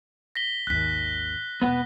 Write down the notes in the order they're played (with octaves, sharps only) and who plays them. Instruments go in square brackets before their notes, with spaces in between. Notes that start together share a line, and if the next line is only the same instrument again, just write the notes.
[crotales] A#6 B6 G7
[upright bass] G#1 D#2 [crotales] F#6 B6
[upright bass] E1 C4 [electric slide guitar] B3 B4 F#5